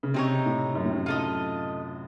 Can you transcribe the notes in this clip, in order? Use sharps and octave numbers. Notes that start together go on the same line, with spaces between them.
C#3
C3 C4 D#4 A4 C#5
A2
F#2
A2
F#2
F4 A4 D#5